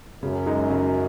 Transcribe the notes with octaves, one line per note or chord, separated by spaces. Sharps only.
F#2 C#3
G#3 D#4
C#3